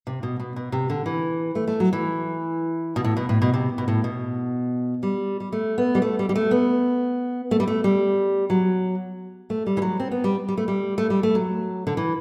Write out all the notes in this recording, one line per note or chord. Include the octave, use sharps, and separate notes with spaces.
C3
B2
B2
B2
C3
D3
E3
A3
A3
F#3
E3
B2
A2
B2
A2
B2
C3
B2
A2
B2
G3
G3
A3
B3
G3
A3
G3
G3
A3
B3
A3
G3
A3
G3
F#3
A3
G3
E3
F#3
C4
B3
G3
G3
A3
G3
A3
G3
A3
F#3
D3
E3